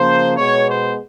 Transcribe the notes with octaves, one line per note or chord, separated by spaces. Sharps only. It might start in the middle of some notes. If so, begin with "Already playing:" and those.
Already playing: C#3 F3 A#3 C5
B2 G#3 B3 C#5
C5